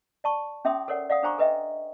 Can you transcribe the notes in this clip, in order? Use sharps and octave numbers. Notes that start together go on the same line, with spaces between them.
D5 A5 C#6
C#4 G#4 E5 G5 C6 D#6
A4 A#4 C#5 D5 F#5
D5 F5 F#5 D#6
D4 G#4 C5 G#5 A#5 C#6
A4 B4 D#5 E5 G5